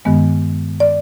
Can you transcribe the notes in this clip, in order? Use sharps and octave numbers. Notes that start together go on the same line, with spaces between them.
G2 D#3 G#3 B3
D5